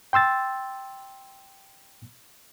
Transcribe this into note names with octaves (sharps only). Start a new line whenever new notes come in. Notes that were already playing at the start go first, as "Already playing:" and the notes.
G5 C6 E6 A6